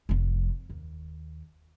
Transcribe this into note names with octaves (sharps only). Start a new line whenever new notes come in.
F1 F3
D#2